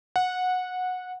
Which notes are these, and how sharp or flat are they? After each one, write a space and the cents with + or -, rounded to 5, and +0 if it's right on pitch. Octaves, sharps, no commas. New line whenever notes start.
F#5 -15